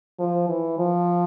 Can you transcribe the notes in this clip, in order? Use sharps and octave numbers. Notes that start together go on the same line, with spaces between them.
F3
E3
F3